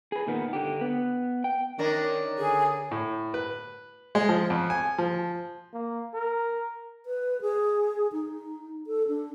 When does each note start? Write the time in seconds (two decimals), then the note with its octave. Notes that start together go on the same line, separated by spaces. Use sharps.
0.12 G#4 B4
0.27 A#2 D#3 B3
0.53 D3 G4
0.81 B3
1.44 G5
1.78 D#3 C#4 D4 A#4
2.38 D3 G#4
2.91 A2
3.34 B4
4.15 G#3
4.29 F3
4.50 F2
4.70 G#5
4.98 F3
5.73 A#3
6.14 A#4
7.06 B4
7.42 G#4
8.12 D#4
8.87 A4
9.08 D4